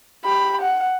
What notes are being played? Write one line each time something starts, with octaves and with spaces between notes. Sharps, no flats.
G4 B5
F#5